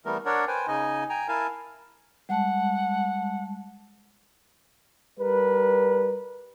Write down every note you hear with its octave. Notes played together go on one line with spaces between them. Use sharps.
E3 G3 A3 B3 A#4
D4 A#4 C#5 D5 F#5
B4 C5 G5 G#5
C#3 D#4 D#5 G#5
G5 G#5 A#5
E4 A#4 F5 G#5 A5
G3 G#3 F#5 A5
G3 A#4 B4